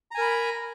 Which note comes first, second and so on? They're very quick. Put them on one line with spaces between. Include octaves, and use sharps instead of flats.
A#5 G#5 A#4 B5